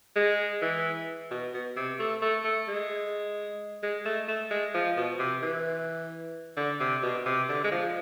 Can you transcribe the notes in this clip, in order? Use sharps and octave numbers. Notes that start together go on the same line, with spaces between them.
G#3
E3
B2
B2
C3
A3
A3
A3
G#3
G#3
A3
A3
G#3
F3
B2
C3
E3
D3
C3
B2
C3
D3
G#3
F3